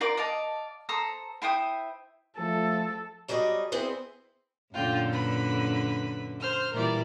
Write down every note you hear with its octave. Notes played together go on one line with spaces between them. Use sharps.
F4 A#4 D5 D6
D5 D#5 F5 A5
A4 C5 A#5 D#6
E4 C5 G5 D#6
F3 A3 A4
F#3 G3 G#4 D5 D#5
B3 C4 E4 G#4 C5
F#2 A#2 D3 F4 G5
B4 B5
C5 F6
A#2 E3 G3 A#4 D5